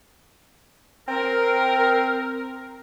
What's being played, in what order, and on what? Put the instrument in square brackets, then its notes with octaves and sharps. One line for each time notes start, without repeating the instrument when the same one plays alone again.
[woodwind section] C4 A#4